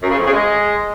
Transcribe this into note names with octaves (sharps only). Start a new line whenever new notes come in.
F#2
C#3
F2
C#3
G#3